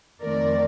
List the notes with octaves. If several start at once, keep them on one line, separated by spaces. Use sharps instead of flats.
F2 D#3 A3 C4 A#4 D5